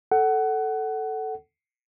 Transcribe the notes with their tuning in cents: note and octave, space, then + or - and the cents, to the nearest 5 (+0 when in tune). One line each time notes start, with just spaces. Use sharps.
A4 +0 F#5 +20